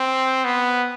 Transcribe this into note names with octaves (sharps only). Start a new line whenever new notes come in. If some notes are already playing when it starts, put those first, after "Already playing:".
Already playing: C4
B3